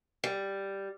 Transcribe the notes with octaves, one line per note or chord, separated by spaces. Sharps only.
G3